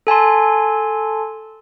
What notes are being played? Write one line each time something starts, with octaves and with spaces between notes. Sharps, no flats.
A4 G#5 A5 C6